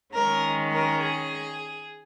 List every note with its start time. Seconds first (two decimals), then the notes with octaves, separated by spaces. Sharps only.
0.13 D#3 G#3 C#4 A#4
0.71 A#4
1.01 G#4